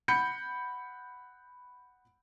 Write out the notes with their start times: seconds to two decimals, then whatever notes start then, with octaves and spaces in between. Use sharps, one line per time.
0.08 F#5 B5 G6 C#7